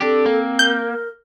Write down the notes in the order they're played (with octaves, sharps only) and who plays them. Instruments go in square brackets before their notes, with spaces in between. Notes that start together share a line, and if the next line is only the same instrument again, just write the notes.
[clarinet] C4 [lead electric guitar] D4 G4 [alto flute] A4
[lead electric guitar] A#3
[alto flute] A#4 [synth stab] G6